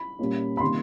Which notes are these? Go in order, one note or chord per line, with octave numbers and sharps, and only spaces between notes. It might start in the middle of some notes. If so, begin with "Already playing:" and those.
Already playing: B5
A#2 G3 A#3 C#4
B5
C3 D#3 G3 A#3 C6